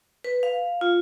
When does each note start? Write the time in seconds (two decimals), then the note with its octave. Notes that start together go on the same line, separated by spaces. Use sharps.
0.24 B4
0.43 F5
0.81 F4